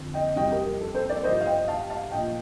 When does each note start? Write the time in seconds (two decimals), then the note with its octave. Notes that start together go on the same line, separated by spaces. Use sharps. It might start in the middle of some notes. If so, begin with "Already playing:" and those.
Already playing: F2 D3
0.14 D#5 G5
0.36 F2 C3 G3 D#5 G5
0.51 G4 A#4
0.66 G4
0.81 A4
0.95 A4 C5
1.09 A#4 D5
1.24 G2 F3 C5 D#5
1.41 F5
1.46 D#5 G5
1.68 F5 A5
1.90 F5 A5
2.11 A#2 F3 D#5 G5